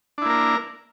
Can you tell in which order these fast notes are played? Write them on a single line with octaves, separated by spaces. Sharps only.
D4 E4 A#3 A#4